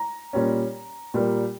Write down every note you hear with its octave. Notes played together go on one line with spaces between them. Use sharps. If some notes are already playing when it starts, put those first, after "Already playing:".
Already playing: A#5
A#2 G3 C#4
A#2 G3 A#3